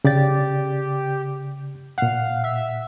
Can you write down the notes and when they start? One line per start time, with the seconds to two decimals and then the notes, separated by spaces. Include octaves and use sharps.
0.04 C#3 G4 D5 A6
1.98 A#2 F5 F#5
2.44 E5